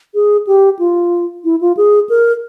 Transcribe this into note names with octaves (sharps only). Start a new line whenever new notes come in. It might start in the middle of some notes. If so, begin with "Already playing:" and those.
G#4
G4
F4
E4
F4
G#4
A#4